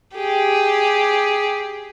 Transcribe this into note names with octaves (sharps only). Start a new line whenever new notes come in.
G4 G#4